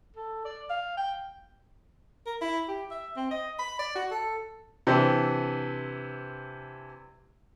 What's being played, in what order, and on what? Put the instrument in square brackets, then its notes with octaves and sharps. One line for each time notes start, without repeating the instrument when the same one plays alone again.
[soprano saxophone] A4
D5
F5
G5
A#4
E4
G4
E5
C4
D#5
B5
D5
F#4
A4
[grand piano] C3 E3 D4 C5